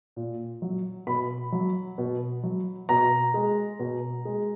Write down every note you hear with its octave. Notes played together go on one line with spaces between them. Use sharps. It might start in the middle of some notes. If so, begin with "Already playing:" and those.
A#2
F#3
B2 B5
F#3
B2
F#3
B2 A#5
G#3
B2
G#3